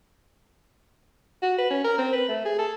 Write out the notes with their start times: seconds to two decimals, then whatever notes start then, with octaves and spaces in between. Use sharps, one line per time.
1.42 F#4
1.58 B4
1.70 C#4
1.84 A#4
1.98 C4
2.12 B4
2.28 A3
2.45 G#4
2.59 A4